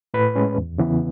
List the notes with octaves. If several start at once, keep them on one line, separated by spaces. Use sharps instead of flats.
A2 B4
G#3 C#4
E2
C#3 E3 B3